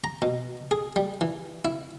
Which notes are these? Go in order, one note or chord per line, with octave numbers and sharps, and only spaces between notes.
A#5
B2
G#4
G3
E3
E4